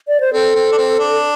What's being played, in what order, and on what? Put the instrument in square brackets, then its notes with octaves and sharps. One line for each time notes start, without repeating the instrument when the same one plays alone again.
[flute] D5
C5
[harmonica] C4 [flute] A4
[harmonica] C4
D4
C4
D4